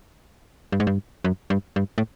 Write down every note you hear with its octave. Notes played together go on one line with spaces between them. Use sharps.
G2
G#2
G2
F#2
G2
G2
A2